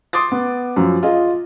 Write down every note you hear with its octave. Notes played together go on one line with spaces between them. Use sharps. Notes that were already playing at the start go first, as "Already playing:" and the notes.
C6 D6 D#6 A6
B3
F#2 F3
F4 G#4 D#5